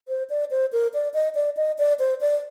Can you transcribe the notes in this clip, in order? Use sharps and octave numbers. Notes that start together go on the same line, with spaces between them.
C5
D5
C5
A#4
D5
D#5
D5
D#5
D5
C5
D5